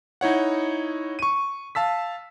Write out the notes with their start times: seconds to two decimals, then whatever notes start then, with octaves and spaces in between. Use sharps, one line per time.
0.21 D#4 E4 C#5 F#5
1.19 C#6 D#7
1.75 F5 A5 E6 B6